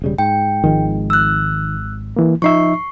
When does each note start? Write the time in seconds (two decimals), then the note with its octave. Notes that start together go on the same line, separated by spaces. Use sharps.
0.02 E1 C#3 G3
0.18 G#2 G5
0.64 G#1 D#3 F3 G#3
1.10 E6 F#6
2.16 E3 A#3
2.42 F3 D#4 E5 C#6 C7